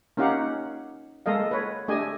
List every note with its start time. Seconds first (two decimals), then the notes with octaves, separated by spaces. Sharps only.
0.17 A#3 C#4 D#4 G4 F5 F#5
1.26 G#3 A#3 A4 D#5 F5
1.51 B4 C#5
1.88 A3 D4 G4 G#4 D#5 G#5